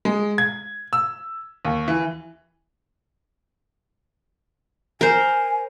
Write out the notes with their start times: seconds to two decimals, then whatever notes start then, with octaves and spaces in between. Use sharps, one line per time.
0.05 G#3
0.38 G#6
0.93 E6
1.65 D#2
1.88 E3
5.01 A#4 C5 G#5